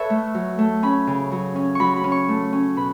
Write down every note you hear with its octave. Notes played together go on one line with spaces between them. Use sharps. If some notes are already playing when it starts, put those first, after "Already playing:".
Already playing: A4 B4 C#5 E5
A3
F#3
A3
C#4 B5
C#3
F#3
C#4
F#3 B5 C#6
B5
C#4
C#6
A3
C#4
B2 B5